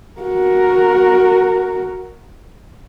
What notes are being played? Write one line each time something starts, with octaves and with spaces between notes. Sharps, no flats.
F#4 A#4